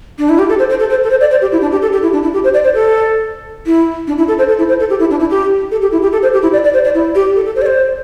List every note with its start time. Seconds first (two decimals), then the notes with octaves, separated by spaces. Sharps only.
0.19 D4
0.29 E4
0.39 G4
0.49 A4
0.59 C5
0.69 C5
0.79 A4
0.90 C5
1.03 A4
1.10 C5
1.21 D5
1.31 C5
1.41 G4
1.52 E4
1.61 D4
1.71 G4
1.82 A4
1.93 G4
2.02 E4
2.13 D4
2.23 E4
2.33 G4
2.44 C5
2.54 D5
2.64 C5
2.74 A4
3.66 E4
4.07 D4
4.18 E4
4.28 A4
4.38 C5
4.48 A4
4.58 E4
4.68 C5
4.79 A4
4.90 G4
4.99 E4
5.10 D4
5.20 E4
5.30 G4
5.71 A4
5.82 G4
5.92 E4
6.02 G4
6.12 A4
6.22 C5
6.33 G4
6.42 E4
6.53 D5
6.64 D5
6.73 C5
6.84 D5
6.94 E4
7.15 G4
7.36 A4
7.46 A4
7.55 C5
7.62 D5
7.66 C5